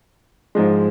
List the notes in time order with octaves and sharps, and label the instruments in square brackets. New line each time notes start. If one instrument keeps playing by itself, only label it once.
[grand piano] G#2 F3 G#3